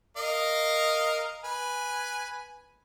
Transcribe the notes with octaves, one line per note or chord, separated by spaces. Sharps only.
A#4 D#5 F5
B4 G#5